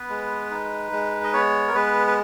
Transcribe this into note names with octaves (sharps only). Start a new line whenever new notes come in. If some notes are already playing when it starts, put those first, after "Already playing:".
Already playing: B3 B4
G#3
D#4
G#3
D#5
B3 C#5
A#4
G#3 B4
B4